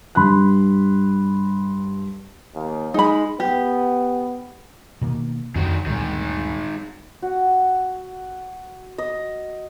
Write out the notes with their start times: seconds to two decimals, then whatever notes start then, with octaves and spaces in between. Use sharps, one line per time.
0.15 G2 B5 C6 F#6
2.55 D#2
2.94 G#3 D#4 B5
3.40 B3 G4
5.01 B2 D#3 A#3
5.56 F2 D3 D#3 F#4
5.86 D2 G2 A#2 D#3 G#3
7.22 F#4
8.98 D#5